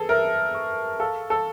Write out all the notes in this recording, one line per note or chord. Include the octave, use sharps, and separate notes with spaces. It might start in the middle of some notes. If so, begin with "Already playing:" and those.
Already playing: G#4 A4 B4 A5
A#4 E5
C#6
A4 F5
A4